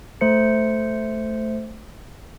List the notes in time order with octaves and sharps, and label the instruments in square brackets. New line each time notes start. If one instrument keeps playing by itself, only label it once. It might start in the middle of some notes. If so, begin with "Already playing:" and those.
[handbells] A3 C5 C#7